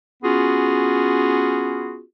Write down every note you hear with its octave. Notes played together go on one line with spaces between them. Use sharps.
B3 C#4 F4 F#4 G#4